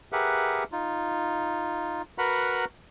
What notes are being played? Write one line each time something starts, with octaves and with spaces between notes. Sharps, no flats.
G4 G#4 A#4 B4 E5 F#5
D#4 F4
F#4 A#4 B4 F#5 A#5 B5